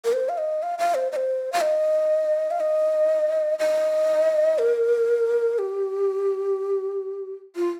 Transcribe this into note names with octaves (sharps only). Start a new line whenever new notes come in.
A#4
C5
F5
D#5
F5
F5
C5
D#5
C5
F5
D#5
F5
D#5
D#5
A#4
G4
F4